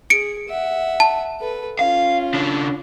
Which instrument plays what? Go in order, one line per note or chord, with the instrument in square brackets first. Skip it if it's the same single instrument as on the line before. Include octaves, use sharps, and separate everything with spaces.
[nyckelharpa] G#4 [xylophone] C#7 D7
[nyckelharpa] E5 F#5
[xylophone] A5
[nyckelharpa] A4 B4
[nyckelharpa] C#4 F4 [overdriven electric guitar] F5
[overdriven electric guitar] C#3 D4